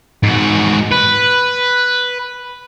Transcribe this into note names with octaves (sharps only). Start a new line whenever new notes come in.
G#2 F#4
B4